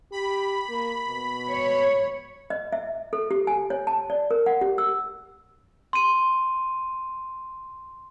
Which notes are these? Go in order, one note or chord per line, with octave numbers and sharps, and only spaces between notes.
G4 B5
A#3
B2
C#5
D#5
E5
A4
G4
G#5
C#5
A5
D5
A#4
F#5
G4
E6
C6 D#7